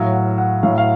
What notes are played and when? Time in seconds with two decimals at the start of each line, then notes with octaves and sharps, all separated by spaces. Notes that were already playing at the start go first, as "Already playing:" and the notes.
Already playing: A2 F#3 F5
0.13 F#5
0.38 F#5
0.63 A2 F#3 F5
0.70 E5
0.78 F5